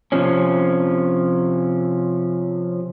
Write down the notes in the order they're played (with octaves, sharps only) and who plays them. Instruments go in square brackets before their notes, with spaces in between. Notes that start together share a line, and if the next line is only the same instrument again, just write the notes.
[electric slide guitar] C3 F3 C#4